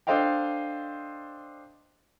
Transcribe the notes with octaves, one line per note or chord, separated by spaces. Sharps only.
D4 A4 C5 D#5 F5 G5